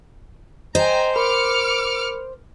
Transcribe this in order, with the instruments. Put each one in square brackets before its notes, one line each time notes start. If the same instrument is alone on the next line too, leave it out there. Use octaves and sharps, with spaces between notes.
[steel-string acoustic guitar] C5 [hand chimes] D#5 [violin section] G5 G#5 A#5
[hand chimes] A#4 B5 [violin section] D6 F6 C#7